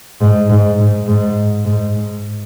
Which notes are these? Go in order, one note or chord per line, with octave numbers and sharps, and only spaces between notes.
G#2
G#2
G#2
G#2
G#2
G#2